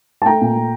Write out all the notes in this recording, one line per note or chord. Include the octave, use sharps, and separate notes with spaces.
A5
A3 G5 A#5
A#2
A3